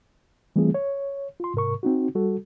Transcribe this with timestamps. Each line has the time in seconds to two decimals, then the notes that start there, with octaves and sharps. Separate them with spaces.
0.56 E3 G3 A3 C4 F4 G#4
0.74 C#5
1.40 F4 C6
1.54 G#2 C3 A#4 C#6
1.83 C4 D#4 F#4
2.15 G3 F#4 A4